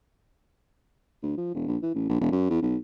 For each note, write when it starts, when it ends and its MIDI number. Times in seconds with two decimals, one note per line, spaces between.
1.23 1.37 38
1.38 1.50 53
1.54 1.66 28
1.68 1.77 34
1.82 1.92 52
1.95 2.08 33
2.09 2.20 34
2.21 2.29 28
2.32 2.48 42
2.50 2.61 40
2.62 2.77 35